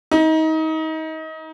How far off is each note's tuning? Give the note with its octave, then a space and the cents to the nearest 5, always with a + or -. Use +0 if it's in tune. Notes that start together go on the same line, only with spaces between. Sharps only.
D#4 +30